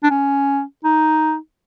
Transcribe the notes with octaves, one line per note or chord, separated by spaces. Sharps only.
D4
C#4
D#4